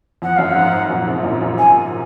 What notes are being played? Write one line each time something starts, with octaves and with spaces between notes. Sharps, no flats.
F2 F#5
F#2 F5
F#5
F2 G#2
F#2 A#2
G#2 C3
F#2 A#2
F#2 A#2
G#5